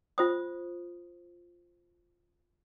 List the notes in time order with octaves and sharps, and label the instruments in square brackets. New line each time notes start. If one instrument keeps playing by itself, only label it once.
[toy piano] F4 C5 D#6